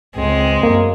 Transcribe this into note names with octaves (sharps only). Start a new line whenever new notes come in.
C#2 G#3 C4
F#2 A#3